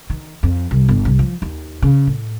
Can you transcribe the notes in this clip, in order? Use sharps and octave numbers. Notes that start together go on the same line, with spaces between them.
D#3
F2
C2
G1
C2
F3
D#2
C#3
A2